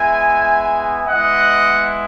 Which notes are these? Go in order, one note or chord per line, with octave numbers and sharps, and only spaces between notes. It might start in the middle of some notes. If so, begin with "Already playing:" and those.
Already playing: G#3 B3 E4 E5 G#5
G#3 B3 E4 D#5 F#5